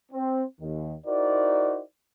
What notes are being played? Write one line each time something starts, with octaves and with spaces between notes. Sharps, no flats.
C4
D#2 D#3
D#4 E4 F#4 A#4 C5 D5